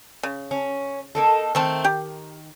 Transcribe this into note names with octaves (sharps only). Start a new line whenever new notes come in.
C#3
C#4
A#3 D#4 A4
D#3 A3 C4 A5
G4